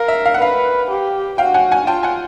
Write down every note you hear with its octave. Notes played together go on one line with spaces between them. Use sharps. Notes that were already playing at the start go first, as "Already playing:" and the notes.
Already playing: A#4 F5
E5
F5
F#5
B4 F5
G4
F#4 F5 G5
F#5 G#5
F#5 G#5
F4 G5 A5
F#5 G#5